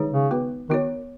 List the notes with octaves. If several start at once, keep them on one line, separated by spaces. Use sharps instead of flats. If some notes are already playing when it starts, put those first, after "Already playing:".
Already playing: D#3 G#3 D#4 G#4 C#5
C#3
B3 F#4 B4
D#3 B3 F#4 C#5